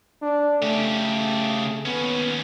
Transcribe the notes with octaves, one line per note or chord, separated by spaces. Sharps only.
D4
C#3 A3 G4
D#2 B3 C#4